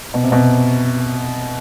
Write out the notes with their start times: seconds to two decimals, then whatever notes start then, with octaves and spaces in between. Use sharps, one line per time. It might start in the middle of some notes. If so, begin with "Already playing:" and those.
0.14 B2
0.23 C3
0.32 B2